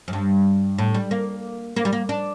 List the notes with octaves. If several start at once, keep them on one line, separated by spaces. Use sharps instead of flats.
F#2
G2
A2
G3
A#3
A#3
G3
A#3
D4